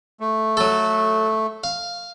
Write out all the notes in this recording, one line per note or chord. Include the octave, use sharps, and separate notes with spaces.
A3
F#3 A4
F5